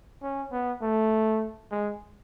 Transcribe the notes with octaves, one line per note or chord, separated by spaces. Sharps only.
C#4
B3
A3
G#3